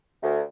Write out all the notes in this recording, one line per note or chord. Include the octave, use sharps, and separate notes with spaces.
D2